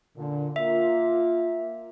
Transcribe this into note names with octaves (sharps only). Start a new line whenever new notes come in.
A#2 D3
A#3 F4 E5